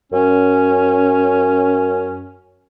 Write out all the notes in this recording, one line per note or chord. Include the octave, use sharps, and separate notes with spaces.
F#2 C#4